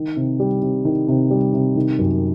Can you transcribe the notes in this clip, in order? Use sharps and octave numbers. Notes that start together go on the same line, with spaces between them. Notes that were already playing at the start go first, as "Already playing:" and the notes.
Already playing: D#3
C3
G3
C3
D#3
C3
G3
C3
D#3
F#2